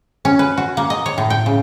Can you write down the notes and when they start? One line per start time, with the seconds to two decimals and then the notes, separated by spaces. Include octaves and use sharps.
0.25 C#4
0.39 B4
0.57 F#4
0.77 A#3
0.90 D#5
1.06 C#5
1.18 A2
1.30 G5
1.46 C#3